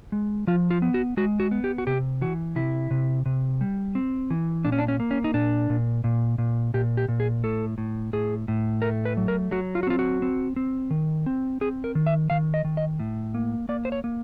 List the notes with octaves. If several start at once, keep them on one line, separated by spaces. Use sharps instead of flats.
G#3
F3 F4
F4
B3
F#4
G#3 F#4
F#4
B3
G4
F#4
C3 G4
E3 F#4
C3 E4
C3
C3
G3
C4
E3
A#2 D4
C#4
D4
C#4
A#3
C#4
D#4
A#2 D4
A#2
A#2
A#2
A#2 G4
G4
A#2
G#4
A2 A4
A2
A2 G#4
A2
A3 A#4
B4
F#3
A#4
F#3 F#4
F4
F#4
C4 F4
F#4
C4
C4
D#3
C4
C4 G#4
A#4
D#3
E5
D#3 F5
D#5
D#3
D#5
A2
A#3
A#3 D5
C5
C#5
A#3